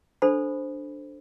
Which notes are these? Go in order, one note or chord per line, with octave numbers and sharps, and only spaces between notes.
D4 A4 C5 B5